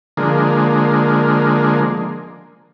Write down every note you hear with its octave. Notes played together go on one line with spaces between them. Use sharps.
D3 F3 G#3 A#3